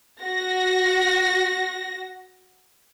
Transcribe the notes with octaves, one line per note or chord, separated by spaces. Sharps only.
F#4 A#6